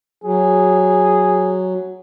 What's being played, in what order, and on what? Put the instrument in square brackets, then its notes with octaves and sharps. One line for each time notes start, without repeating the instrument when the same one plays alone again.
[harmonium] F#3 [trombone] G#4